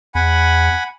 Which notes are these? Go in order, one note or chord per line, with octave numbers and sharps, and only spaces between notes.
E2 F#5 G#5 B5